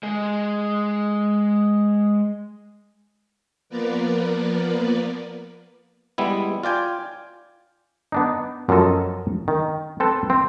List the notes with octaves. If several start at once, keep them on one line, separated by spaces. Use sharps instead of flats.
G#3 G#4
F3 A#3 B3 A#4 B4 D5
G3 G#3 B3 E4
F4 D5 G5 G#5
B3 D4 D#4
F#2 F3 F#3 A4 D#5
D#3
C4 A4 B4
C4